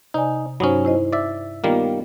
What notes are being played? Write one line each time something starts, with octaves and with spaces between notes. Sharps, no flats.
C3 D#4 D5 G#5
G2 F#3 C#4 D#4 C5
E4 C5 D#5
D5 E5
D#3 G3 A#3 B3 F4